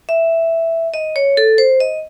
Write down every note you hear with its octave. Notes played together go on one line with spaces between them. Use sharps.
E5
D#5
C#5
A4
C5
D#5